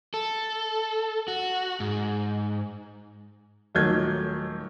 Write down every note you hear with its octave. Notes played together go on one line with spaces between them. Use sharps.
A4
F#4
G#2
D#1 D#3 F#3 A3 G6 G#6